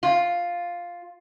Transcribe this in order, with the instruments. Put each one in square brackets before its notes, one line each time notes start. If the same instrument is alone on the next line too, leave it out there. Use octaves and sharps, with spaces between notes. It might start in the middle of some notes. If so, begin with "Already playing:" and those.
[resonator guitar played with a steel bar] F4